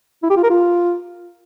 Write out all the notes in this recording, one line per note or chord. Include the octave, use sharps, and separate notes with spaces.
E4
G4
F4
A#4
F4